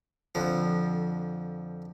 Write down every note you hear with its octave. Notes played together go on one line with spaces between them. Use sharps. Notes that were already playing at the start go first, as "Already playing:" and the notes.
F2 D3 F3